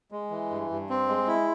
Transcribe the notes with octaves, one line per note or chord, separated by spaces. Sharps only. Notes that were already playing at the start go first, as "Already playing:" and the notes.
G#3
E3
G2
G2
C4
G#3
E4